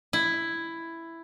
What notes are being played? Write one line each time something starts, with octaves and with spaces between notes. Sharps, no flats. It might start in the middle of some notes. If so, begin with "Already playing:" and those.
E4